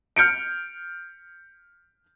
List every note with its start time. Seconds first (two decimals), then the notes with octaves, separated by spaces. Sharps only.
0.16 F6 G6 C#7 D7